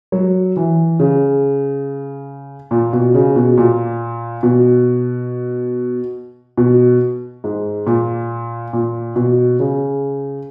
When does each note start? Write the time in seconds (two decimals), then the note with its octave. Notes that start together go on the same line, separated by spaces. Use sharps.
0.12 F#3
0.56 E3
0.99 C#3
2.71 A#2
2.93 B2
3.14 C#3
3.36 B2
3.58 A#2
4.43 B2
6.57 B2
7.44 G#2
7.87 A#2
8.73 A#2
9.16 B2
9.59 C#3